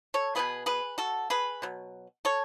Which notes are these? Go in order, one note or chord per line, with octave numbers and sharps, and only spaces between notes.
A4 C#5
B2 F#3 B3 G#4 B4
G#4 B4
F#4 A4
G#4 B4
B2 F#3
A4 C#5